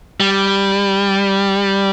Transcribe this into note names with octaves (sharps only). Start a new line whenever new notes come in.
G3